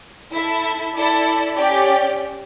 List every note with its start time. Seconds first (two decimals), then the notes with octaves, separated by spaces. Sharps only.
0.33 E4 A4 E5
0.94 E4 A4 D5
1.56 C#4 G4 D5 G5